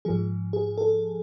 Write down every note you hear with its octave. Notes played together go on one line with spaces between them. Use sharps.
G#2 F3 G#4
G#4
A4